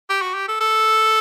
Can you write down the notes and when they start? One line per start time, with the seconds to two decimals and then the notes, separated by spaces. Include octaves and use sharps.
0.10 G4
0.22 F#4
0.34 G4
0.48 A4
0.60 A4